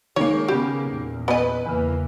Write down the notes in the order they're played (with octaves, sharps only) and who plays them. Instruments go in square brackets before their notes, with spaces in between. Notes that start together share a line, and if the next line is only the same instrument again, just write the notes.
[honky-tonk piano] D#3 A#3 [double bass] G#3 [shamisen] C#5
[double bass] C#3 B3 [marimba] C#4 B5 [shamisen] G4
[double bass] E2 A#2
[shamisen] B3 D#5 [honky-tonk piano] B4 [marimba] G#5
[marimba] E2 C#3 [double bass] E3 A#3